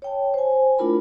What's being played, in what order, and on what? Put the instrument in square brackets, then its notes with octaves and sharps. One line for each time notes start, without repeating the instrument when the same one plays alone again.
[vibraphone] C#5 G5 A5
C5 G#5
A3 D4 E4 F4 A#4 B5